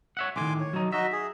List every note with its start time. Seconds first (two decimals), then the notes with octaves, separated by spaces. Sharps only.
0.17 C#5 E5 F#5
0.36 C2 A2 D#3 G#5 C6 D6
0.60 C#5
0.73 F#3 D#4
0.92 D#4 F#4 D#5 E5
1.12 G#4